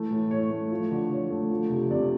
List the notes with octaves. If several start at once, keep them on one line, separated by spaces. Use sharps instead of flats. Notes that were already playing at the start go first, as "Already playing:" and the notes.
Already playing: E3 A3
A2
A2 C#5
A3
F3
D3
D3 C#5
A3
F3
C3
C3 D5